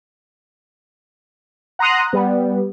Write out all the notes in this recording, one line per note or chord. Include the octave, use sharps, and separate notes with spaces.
F#5 A#5 C6 D#6 F#6
G3 B3